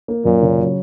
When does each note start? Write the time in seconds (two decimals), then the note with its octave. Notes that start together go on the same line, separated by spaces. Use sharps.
0.08 A#3
0.25 F#2 A#2
0.42 C#3
0.59 F#3